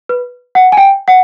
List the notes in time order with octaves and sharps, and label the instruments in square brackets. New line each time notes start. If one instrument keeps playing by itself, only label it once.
[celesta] B4
F#5
G#5
G5
F#5